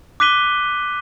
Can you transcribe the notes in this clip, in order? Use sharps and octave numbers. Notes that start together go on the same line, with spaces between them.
D6 F#6 B6 D#7 G7